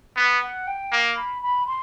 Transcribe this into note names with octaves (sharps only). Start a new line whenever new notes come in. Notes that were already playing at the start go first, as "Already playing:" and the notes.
B3
F#5
G5
A#3
B5
B5
C6